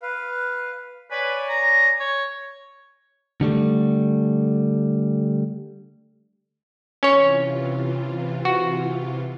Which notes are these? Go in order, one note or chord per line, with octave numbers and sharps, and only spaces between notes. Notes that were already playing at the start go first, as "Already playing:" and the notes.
B4 F5
B4 C#5 D5 G#5
A#5
C#5
D3 G3 A3
C3 E3 C#4 F4 C#5
F#4